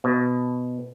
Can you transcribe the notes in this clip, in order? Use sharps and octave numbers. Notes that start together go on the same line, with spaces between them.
B2